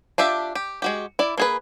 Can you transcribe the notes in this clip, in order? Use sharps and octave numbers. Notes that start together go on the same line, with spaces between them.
D4 F4 G4 E5 A5
G4
G#3 F#4 G4
E4 D5
A#3 G#4 B4